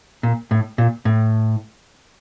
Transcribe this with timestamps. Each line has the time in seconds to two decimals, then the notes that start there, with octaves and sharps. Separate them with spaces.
0.23 A#2
0.51 A2
0.78 A#2
1.05 A2